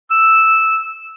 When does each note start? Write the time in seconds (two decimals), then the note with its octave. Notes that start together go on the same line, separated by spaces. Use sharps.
0.11 E6